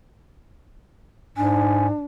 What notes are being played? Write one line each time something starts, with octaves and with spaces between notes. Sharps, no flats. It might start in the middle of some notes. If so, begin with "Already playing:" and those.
G#2 D4 G#5